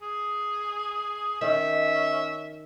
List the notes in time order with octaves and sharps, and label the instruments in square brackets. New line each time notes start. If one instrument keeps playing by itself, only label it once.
[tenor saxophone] G#4
[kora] D#3 [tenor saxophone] C#4 [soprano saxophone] E5